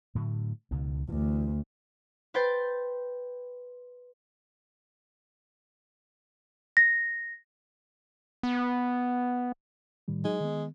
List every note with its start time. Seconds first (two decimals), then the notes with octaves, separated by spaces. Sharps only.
0.15 A2 D3 F#3
0.71 C#2 B2 D#3
1.09 D2 E3
2.34 B4 C5 G5 C6 G6 A6
6.77 A#6
8.43 B3
10.08 A2 D#3 G3
10.25 F#3 G#3 D#4
10.40 D#3 B3